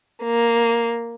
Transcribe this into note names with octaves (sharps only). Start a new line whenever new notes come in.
A#3